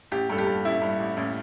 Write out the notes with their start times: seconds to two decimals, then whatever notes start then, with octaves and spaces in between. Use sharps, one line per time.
0.12 A1 G4
0.30 G2 A4
0.38 G4
0.47 G2
0.65 A1 E4
0.82 G2
1.00 A1
1.17 A1